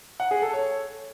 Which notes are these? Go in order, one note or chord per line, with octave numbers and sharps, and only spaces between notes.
F#5
G#4
A4
C#5